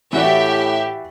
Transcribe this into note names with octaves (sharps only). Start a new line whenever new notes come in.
A2 E3 F#4 G4 D5 E5